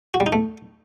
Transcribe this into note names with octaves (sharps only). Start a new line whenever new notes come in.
F#4
G3
D#4
A3